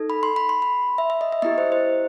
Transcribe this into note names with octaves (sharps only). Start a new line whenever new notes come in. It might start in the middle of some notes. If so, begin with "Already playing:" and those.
Already playing: D#4 A4
B5
C6
B5
C6
B5
E5
E5
D#5
E5
B3 E4 G4 D#5
C5
C5